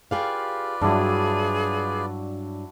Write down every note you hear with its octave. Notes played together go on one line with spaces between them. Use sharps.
F4 G4 G#4 B4 D5 F5
G2 F#3 D4 E4 F#4 G#4